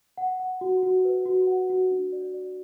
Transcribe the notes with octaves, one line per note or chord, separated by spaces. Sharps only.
F#5
F#5
F#4
F#4
B4
F#4
F#5
F#4
D4
D5
D5